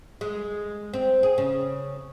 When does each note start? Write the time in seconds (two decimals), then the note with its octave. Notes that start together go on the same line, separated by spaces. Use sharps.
0.21 G#3
0.93 C4
1.23 G#4
1.38 C#3